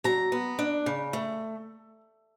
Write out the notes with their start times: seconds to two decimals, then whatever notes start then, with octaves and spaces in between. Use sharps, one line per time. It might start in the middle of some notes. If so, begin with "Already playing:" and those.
0.04 F#3 A#5
0.32 B3
0.59 D4
0.86 C#3
1.13 A3